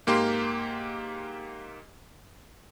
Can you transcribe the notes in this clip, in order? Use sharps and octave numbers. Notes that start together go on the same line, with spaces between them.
G#2 A#3 G4 F5 C6